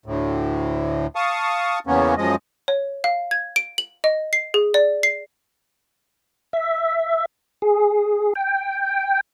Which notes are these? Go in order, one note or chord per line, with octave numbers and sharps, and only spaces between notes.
D2 A2
F5 A5 C#6 D#6
E2 C#3 A#3 B3 C#4
F#2 F3 G#3 D#5
C#5
F5
G#6
D7
F#7
D#5
C7
G#4
D5
C7
E5
G#4
G5